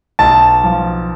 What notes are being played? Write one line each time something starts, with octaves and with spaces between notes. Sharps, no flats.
B1 A5
F3